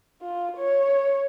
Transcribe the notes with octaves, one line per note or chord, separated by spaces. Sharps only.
F4
C#5